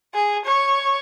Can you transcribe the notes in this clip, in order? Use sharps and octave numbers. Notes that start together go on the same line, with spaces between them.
G#4
C#5